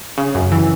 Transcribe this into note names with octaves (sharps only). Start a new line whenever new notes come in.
C#3
F#2
E3